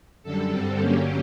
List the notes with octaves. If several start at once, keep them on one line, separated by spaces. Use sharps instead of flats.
F#2 D3 G3 A4
G2 D3 G3 C4
G2 D3 F#3 A#3 C#4 G4